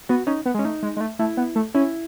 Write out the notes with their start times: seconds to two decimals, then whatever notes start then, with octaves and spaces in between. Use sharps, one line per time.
0.09 B3 F#4
0.27 C#4 D#4
0.46 B3
0.54 G#3
0.59 C#4
0.64 A3 D#4
0.83 G#3
0.97 G#3
1.01 A3
1.19 A3 E4
1.37 B3
1.56 A3
1.74 C#4 E4